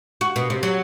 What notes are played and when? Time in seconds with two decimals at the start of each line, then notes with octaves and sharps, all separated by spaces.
0.21 F#4
0.36 B2
0.50 C3
0.63 F#3